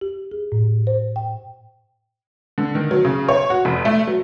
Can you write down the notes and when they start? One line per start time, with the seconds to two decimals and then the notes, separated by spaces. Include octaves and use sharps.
0.01 G4
0.31 G#4
0.52 A2
0.87 C5
1.16 G5
2.58 D3
2.75 D#3
2.91 F#3
3.05 C#3
3.28 C#5
3.50 F#4
3.65 F1
3.85 A3
4.07 F#3